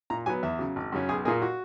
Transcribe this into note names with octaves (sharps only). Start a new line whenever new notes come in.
A#2 A#5
F#3 B3 G#5
E2 E5
C#3 F#3
G#1
F#2 C#3 F#3 C#4
B1 G#4
A#2 A#3 G#4
F#4